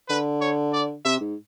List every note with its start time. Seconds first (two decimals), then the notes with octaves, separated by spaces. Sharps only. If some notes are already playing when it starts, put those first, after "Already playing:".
0.09 D3 B4
0.41 C#5
0.73 D5
1.05 C3 E5
1.20 G#2